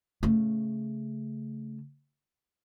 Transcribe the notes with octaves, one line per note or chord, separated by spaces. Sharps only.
C#3 A3